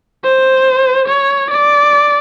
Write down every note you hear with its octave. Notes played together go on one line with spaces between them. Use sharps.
C5
C#5
D5